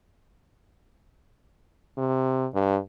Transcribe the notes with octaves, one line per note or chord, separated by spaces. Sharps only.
C3
G2